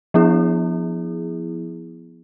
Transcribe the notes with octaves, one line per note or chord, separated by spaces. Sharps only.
F3 B3 E4 G#4